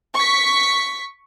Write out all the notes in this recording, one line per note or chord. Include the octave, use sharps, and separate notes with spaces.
C#6 B6